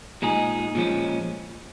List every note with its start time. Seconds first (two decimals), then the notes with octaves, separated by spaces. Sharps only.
0.22 A#2 G#3 D#4 G#4
0.75 A#2 F3 G#3 C#4